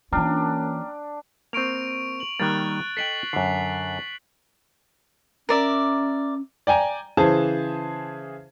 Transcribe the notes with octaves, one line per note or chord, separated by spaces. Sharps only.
E3 A#3 C#4 D4 F4 G5 A#5 F6
A#3 C4 C#6 D7 F7
F#7
D#3 G3 A#3 F#6 A6
A4 D#5 G5 B6 C7 F#7
F#2 D3 C7
C#4 A#4 D5 E5
D5 G5 G#5 A#5
C#3 E3 G#4 C5 A5